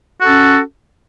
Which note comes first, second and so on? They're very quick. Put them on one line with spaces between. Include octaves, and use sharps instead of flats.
F#4 A4 C#4